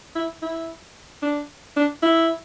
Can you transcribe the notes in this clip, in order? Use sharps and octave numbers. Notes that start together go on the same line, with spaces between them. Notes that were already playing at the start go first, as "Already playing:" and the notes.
E4
E4
D4
D4
E4